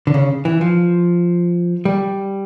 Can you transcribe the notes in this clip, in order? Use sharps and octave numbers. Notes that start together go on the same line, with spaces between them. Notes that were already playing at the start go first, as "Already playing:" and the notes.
D3
C#3
E3
F3
G3